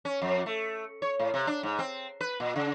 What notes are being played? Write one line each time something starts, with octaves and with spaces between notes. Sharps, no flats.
C#4
F2
A3
C#5
A2
C3
D4
G#2
C4
B4
A#2
C#3